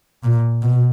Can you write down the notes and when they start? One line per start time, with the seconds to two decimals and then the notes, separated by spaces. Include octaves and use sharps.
0.23 A#2
0.63 B2